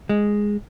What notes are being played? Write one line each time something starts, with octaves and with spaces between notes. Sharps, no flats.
G#3